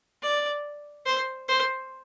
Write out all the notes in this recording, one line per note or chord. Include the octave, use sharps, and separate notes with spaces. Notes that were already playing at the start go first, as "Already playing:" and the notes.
D5
C5
C5